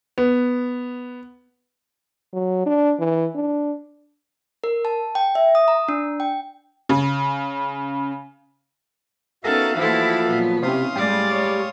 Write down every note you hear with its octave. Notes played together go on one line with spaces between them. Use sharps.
B3
F#3
D4
E3
D4
A#4
A5
G5
E5
D#6
A#5
D4
G5
C#3
B3 C#4 D#4 F#4 A4 A#4 E5 F5
E3 F3 A3 A#3 E4 A4
A#2 F#3 B3
C3 C4 C#4 E4 F5 C6 D#6
A2 G3 G#3 D5
C#5